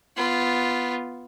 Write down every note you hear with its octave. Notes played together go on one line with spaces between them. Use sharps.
B3 F4